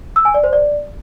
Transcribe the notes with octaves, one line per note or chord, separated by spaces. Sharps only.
E6
G#5
D5
C5
D5